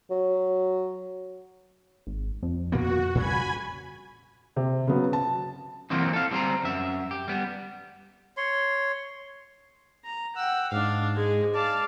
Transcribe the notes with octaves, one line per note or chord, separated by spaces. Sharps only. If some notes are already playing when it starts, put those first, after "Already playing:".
F#3
G#1
F2
A#2 A#3 B3 F#4
A#2 C#3 G3 G#5 B5 G#6
C3
C#3 F#3 B3
A5
E3 F#3 A#3 C4 D#4
A4 F5
G3 C4 C5 A#5
F#2 E5
G4
G3 B3
C#5 C6
A#5
F#5 G5 E6
G#2 D4 F5
G#3 G#4
D5 F5 A5